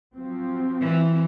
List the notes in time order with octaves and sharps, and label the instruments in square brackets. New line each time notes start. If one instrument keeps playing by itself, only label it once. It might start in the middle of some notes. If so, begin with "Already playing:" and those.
[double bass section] F3 F#3 C4
[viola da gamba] E3